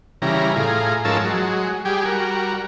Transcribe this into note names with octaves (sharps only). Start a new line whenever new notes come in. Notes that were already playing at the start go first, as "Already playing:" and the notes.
C#3 E3 G3 A#5
A2 F4 G#4 A#5
G#2 F3 C#4 A#4 A5 E6
F#3 G#3
G3 G4 G#4
G3 F#4 A#4